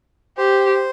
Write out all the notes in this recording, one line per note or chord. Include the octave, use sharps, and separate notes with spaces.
G4 C5